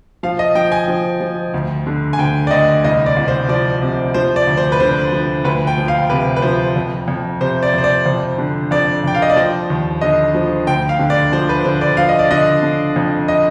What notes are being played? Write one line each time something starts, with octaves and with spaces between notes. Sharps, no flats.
F3 F5
D#5
F3 G5
G#5
F3
F3
D2
D3
G#5
D2 G5
D5
D2 D#5
C2 D#5
D5
C2
C5
F3 D5
C3
F3 C5
D5
D2
C5
B4
D3 C5
F3
D2 B4
G5
F3
F5
C3 B4
B4
F3 C5
F2
F2
C3 C5
D5
F2 C5
D5
F2 C5
D3
F2 D5
F2 G5
F5
D#5
D5
F3 C5
D#2
D3 D#5
F3
D2 G5
F5
D3
D5
F3 C5
B4
D3 C5
D5
F3 F5
D#5
D5
D3 D#5
D3
F2
D#5